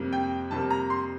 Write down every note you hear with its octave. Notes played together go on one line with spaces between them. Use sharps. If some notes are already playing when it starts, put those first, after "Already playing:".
Already playing: F2 C3 G3 A#3
G5
F2 C3 G3 A#3 A5
A#5
C6